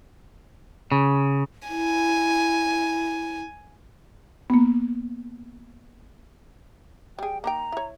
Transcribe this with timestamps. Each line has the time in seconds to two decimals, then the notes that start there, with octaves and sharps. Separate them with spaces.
0.92 C#3
1.68 E4 G#5
4.50 A#3 B3
7.19 G3 G#4 G5
7.44 A#3 D#4 G5 A#5
7.72 E4 C#5